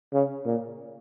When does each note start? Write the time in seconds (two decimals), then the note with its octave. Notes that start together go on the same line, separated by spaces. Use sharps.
0.13 C#3
0.45 A#2